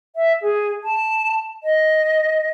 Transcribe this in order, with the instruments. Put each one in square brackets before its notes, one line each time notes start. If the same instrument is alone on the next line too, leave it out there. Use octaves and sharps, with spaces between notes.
[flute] E5
G#4
A5
D#5